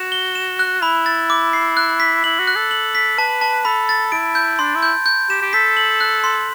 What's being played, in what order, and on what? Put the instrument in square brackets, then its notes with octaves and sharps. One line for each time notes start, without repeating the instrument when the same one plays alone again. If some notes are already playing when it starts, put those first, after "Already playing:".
Already playing: [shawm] F#4 [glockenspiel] E7
[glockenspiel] G7
E7
F#6
[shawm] E4 [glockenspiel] B5
[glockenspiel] A6
D6
C7
F#6
B6
[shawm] E4 [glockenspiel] F#7
[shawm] F#4
[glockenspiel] F#6
[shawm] A4
[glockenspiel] F#7
B6
[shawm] B4 [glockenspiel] A5
[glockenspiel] A5
[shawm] A4 [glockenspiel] B5
[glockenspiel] A6
[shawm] E4 [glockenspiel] D7
[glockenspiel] G6
[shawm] D4 [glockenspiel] C6
[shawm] E4
[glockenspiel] G6
G6
[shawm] G4 [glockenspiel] E7
[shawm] G4
[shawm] A4 [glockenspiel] B6
[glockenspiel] F#7
F#6
C6